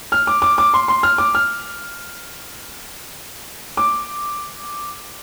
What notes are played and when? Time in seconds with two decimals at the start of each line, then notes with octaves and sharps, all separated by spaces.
0.12 F6
0.27 D6
0.42 D6
0.58 D6
0.74 C6
0.88 C6
1.03 F6
1.18 D6
1.35 F6
3.77 D6